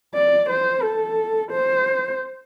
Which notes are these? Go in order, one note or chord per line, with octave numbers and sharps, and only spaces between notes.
D5
C5
A4
C5